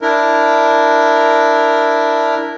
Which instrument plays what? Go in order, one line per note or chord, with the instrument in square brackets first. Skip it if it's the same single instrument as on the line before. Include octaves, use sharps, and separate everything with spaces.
[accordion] D4 E4 A#4